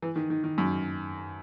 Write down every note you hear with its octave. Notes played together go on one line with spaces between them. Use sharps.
E3
D#3
D#3
D#3
F#2